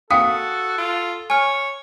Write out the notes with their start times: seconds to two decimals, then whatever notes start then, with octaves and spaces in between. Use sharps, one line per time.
0.11 F#4 A4 F5 G5 D#6
0.78 F4
1.30 C#5 G#5 F6